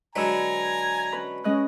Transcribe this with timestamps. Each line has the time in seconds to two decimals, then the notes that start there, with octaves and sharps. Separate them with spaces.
0.16 D3 F#3 G#3 B4 G#5 A#5 B5 E6
1.12 C#4 B4 B5
1.44 G#3 C#4 D#5 F#6